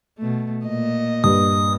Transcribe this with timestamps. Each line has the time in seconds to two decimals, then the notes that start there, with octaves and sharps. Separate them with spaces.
0.18 B2 A3
0.65 A#2 D#5
1.24 G2 D#6